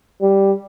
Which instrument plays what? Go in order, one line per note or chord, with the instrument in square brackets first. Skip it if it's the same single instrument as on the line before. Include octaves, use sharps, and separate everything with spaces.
[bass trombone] G3